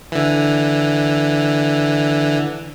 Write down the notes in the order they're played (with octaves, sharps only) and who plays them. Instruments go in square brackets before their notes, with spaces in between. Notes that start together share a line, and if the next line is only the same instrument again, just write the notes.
[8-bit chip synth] D3 E3